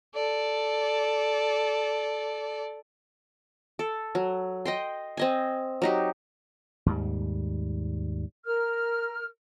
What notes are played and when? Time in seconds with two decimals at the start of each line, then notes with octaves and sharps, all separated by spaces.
0.15 A4 D5
3.79 A4
4.15 F#3
4.65 D#5 G5 C6
5.17 C4 D#5 G#5
5.82 F#3 D#4 G4
6.86 D#2 G#2 G3
8.45 A#4 F6